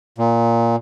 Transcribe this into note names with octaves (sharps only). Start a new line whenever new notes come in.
A#2